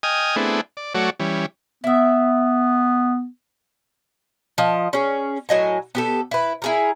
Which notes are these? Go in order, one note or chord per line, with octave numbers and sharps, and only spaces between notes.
D#5 G5 G#5 D#6 F6
A3 B3 C4 D4 E4 G#4
D5
F#3 A3 F#4 C#5 D5
E3 G3 C#4
B3 E4 E5
F3 D#5
C#4 G#4
A2 F#3 D#5 G#5
B3 G4 A4
E4 B4
E4 G#4 A#4